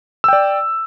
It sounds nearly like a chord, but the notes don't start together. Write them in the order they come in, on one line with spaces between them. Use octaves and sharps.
E6 G5 D5